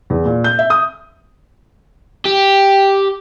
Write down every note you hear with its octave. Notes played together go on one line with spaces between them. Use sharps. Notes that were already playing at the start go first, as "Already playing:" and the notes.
E2
A#2
G6
E5
D#6
G4